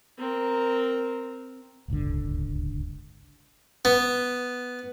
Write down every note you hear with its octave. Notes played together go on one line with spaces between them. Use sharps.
C4 A#4
D1 G1 C#2 D3
B3